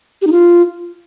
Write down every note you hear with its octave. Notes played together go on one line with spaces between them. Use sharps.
G4
D#4
F4